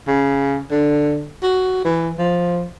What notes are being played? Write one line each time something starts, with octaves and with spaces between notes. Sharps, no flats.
C#3
D3
F#4
E3
F3